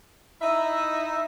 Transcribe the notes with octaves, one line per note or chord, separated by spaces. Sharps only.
D#4 E4 D#5 E5